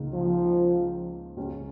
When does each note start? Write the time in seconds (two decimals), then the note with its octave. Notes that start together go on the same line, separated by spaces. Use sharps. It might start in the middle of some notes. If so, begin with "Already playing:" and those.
Already playing: C#2 C#3 A#3 D#4
0.13 F3
1.37 C#2 C#3 G#3 C#4